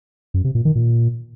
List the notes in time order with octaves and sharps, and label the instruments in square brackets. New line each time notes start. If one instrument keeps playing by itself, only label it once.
[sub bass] F#2
C3
A#2
D#3
A#2